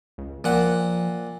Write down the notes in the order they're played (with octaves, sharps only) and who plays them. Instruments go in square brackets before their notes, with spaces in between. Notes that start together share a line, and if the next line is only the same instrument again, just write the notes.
[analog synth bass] C#2
[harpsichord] A#2 F#5 [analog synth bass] F3